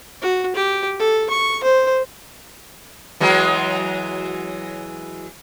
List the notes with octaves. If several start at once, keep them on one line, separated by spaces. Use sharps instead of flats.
F#4
G4
A4
C#6
C5
E3 F#3 G#3